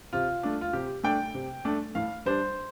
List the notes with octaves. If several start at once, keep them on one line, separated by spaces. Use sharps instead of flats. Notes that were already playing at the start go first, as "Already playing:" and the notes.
C3 F4
A3 D4
F4
C3 G4
A3 D4 G5
C3
A3 D4
A2 F5
G3 D4 C5